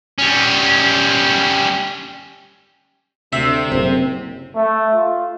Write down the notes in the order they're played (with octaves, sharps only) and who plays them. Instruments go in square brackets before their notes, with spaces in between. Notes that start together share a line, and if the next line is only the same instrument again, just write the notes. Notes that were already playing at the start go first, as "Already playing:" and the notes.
[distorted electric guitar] G3 C#4
[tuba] D2 [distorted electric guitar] C3 [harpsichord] E5
[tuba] F#1 [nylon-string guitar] C4
[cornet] A3
F4